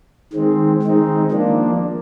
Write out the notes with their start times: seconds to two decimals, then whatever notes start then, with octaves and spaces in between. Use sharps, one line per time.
0.33 D#3 G#3 C4
0.82 D#3 G#3 C4 D#4
1.32 F3 A#3 D4